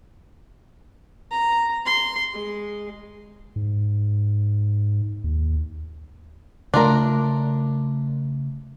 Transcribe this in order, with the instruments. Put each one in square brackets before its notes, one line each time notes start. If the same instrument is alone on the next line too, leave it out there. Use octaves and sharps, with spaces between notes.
[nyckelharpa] A#5
C6
G#3
[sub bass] G#2
D#2
[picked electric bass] C#3 A3 [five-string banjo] D4 F4 A#4